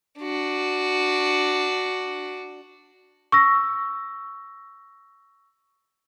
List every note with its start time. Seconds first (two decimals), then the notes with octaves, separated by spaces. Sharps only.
0.19 D4 F#4
3.32 C#6 E6 A#6